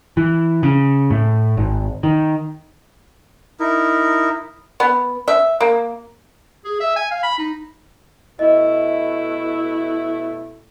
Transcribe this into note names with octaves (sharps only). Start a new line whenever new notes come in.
E3
C#3
A2
G#1
D#3
D#4 E4 A#4
B3
E5
A#3
G#4
E5
G#5
F5
B5
D#4
B2 A3 E4 D#5